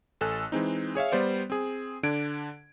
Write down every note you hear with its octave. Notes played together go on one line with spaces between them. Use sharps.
A1 A4 G#5 E6 F#6
E3 G#3 C4 D#4
G#4 C#5 E5 F5
G3 B3 C5 D5
C4 G#4
D3 D4 G#6 D7